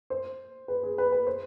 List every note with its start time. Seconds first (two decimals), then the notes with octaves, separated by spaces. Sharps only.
0.10 C5
0.68 B4
0.83 G#4
0.98 B4
1.12 B4
1.27 C5